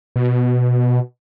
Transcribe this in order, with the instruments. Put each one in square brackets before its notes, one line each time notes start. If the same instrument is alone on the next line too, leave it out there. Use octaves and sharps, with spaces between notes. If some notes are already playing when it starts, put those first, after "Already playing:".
[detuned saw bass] B2